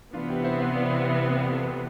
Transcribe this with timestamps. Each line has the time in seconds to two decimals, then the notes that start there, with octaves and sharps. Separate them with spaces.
0.13 C3 E3 B3 D4 F4
0.28 E4 G4
0.44 C5 E5
0.59 C5 E5
0.74 D5 F5
0.91 C5 E5
1.01 F5
1.05 C5 E5
1.37 D5 F5
1.51 F4 A4
1.67 G4 B4